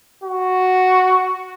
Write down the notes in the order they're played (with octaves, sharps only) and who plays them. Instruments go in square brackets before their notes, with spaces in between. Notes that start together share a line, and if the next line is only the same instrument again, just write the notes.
[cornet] F#4